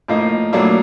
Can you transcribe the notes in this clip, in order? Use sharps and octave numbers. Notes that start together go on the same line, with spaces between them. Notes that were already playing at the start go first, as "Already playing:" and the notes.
A2 F3 A#3 D#4
A2 F#3 A#3 D4